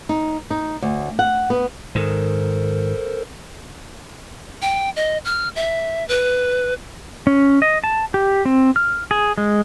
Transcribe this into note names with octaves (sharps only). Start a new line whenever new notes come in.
D#4
D#4
D2
F#5
B3
G#2 D#3 A4 A#4 C5
G5
D#5
F6
E5
B4
C#4
D#5
A5
G4
C4
F6
G#4
G#3